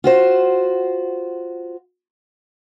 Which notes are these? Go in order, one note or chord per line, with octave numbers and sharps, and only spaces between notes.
F4 F#4 C5